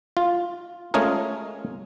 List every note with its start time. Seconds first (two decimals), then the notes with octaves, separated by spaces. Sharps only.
0.17 F4
0.94 G#3 A3 C#4 F4 G#4 A#4